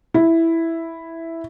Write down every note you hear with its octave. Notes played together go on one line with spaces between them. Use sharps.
E4